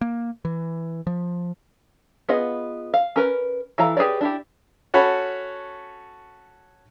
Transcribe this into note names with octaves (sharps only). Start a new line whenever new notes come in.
A#3
E3
F3
B3 F4 G#4 D#5 F#5
F5
C#4 A#4 B4
E3 E4 A4 F5 A#5
G4 G#4 B4 C#5 D5
D4 E4 G4
C#4 F#4 A4 C#5 B5